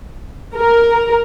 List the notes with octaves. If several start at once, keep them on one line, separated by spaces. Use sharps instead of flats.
A#4